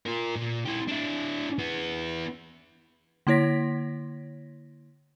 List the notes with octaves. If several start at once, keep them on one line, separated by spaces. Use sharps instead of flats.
F4 A#4
A#2
E4 G4
D4 E4
B3 E4
D3 A#3 E4 C#5 A#6 B6